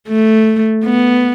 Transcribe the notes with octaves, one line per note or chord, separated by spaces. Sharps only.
A3
B3